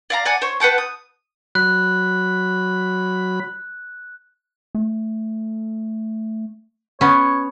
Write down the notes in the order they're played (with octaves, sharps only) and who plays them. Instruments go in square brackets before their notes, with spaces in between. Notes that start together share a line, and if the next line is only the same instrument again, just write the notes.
[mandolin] D5 F5 A#5
D5 F#5 G#5 A5
C5 C#5
B4 F#5 G5 A5
D#6
[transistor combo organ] F#3 B5 [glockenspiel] F#6
[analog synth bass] A3
[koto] B3 C#4 [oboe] C#5